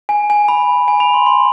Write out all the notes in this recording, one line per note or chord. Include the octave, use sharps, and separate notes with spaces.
G#5
G#5
B5
G#5
B5
C6
C6